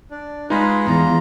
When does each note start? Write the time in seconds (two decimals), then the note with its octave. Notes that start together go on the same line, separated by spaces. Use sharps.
0.11 D4
0.50 G#3 D#4 F4 G#4 B4
0.87 E2 F4 A#5